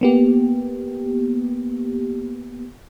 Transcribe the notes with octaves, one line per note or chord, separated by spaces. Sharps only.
A#3 B3 G4